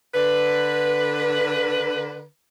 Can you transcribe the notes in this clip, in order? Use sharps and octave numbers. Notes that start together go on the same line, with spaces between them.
D3 B4